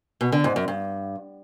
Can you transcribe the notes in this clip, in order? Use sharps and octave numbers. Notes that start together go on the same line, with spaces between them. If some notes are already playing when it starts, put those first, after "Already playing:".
B2
D3
G#2
F#2
G2